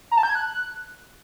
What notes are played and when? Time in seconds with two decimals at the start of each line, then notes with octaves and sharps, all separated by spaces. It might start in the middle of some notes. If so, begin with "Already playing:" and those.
0.11 A#5
0.17 A5
0.23 G6
0.29 G#6
0.35 F#6